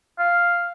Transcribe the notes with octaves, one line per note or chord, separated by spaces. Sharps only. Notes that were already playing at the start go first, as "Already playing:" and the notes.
F5